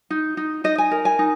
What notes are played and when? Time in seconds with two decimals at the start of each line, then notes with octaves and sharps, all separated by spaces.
0.10 D#4
0.37 D#4
0.64 D#4 D#5
0.78 G#5
0.91 A#4
1.05 G#5
1.19 D#4